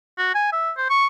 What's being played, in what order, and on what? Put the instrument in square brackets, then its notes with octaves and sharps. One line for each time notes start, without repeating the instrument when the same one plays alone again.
[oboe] F#4
G#5
E5
C5
C#6